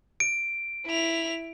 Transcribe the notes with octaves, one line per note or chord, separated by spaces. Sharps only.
D7
E4 F7